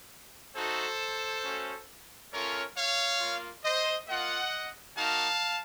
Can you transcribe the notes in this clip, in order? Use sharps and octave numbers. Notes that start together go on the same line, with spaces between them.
A3 D#4 F#4 A4 C5
A3 C#4 F#4
A3 C#4 F4 A#4 C#5
C#5 F5
A#3 F4
C5 D#5
A#3 F4 D#5 F#5
A#3 D#4 F#4 F5 A5